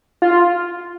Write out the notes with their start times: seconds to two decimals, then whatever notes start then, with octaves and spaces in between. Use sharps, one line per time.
0.22 F4